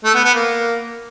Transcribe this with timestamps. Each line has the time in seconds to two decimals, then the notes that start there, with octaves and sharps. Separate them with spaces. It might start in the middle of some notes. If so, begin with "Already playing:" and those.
0.04 A3
0.14 B3
0.24 B3
0.34 A#3